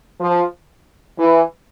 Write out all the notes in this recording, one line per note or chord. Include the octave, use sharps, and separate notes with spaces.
F3
E3